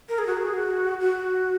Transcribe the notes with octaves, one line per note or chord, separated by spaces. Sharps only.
A#4
G#4
F#4
G#4
F#4
F#4